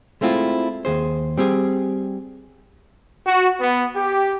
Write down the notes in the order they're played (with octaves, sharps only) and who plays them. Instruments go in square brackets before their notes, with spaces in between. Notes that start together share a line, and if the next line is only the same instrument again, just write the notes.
[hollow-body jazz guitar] G#3 A3 C4 E4 F4
D#2 G#4 C5
G3 C4 G4 G#4
[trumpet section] F#4
B3
G4